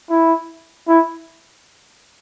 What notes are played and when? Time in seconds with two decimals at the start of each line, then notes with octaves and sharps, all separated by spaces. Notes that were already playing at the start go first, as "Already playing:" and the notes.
0.09 E4
0.87 E4